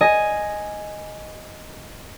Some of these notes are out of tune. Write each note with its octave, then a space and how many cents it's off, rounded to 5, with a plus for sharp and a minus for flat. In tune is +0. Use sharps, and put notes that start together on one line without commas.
D#5 +0 G#5 +0